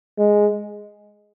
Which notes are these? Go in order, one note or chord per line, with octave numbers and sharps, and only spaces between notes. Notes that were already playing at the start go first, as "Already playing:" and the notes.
G#3